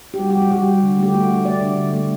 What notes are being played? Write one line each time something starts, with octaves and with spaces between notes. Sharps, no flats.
G4
G3 F#4
G4
G3
F#4
G3 G4
G3
D3
A3 G4
A3 F#4
A3
A3 D5
D3
D3
A3